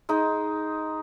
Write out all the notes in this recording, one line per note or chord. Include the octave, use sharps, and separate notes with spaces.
G#3 D#4